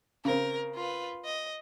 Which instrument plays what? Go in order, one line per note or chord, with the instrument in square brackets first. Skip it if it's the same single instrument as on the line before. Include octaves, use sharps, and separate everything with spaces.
[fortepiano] C#3 C4 [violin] A#4
[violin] F4 B4
D#5